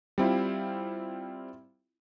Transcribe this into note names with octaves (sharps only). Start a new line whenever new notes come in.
G3 C4 E4 F4